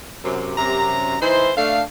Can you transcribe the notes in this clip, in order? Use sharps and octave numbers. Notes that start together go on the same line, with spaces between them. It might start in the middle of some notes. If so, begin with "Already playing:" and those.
F#2 C3
F#2 C3 A#5
E3 D#4 E4 C5
A3 D4 F5